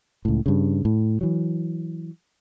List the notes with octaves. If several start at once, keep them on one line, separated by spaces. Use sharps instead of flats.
C#2 A2
G2 C#3
A2
E3 F#3